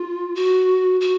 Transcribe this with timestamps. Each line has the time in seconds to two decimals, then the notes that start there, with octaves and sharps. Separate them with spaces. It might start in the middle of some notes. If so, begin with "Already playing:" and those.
Already playing: F4
0.35 F#4
1.01 F#4